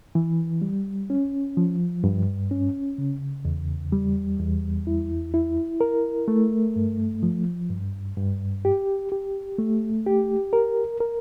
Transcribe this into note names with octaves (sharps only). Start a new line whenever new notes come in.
E3
G3
C#4
F3
G2
C#4
C#3
E2
G3
E2
E4
E4
A#4
A3
G2
F3
G2
G2
G4
G4
A3
G4
A#4
A#4